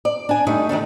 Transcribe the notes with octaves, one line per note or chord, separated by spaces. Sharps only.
D5
D4 G#5
G3 A3 D#4
D#3 F3 D4 A4